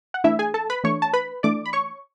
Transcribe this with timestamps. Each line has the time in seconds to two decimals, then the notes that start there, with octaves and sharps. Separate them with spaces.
0.14 F#5
0.24 E3 A3 D4 E4 E5
0.39 G#4 G#5
0.54 A4 A5
0.70 B4 B5
0.84 E3 A3 D4 C#5 C#6
1.02 A5
1.13 B4 B5
1.43 E3 A3 D4 D5 D6
1.66 B5
1.73 C#5 C#6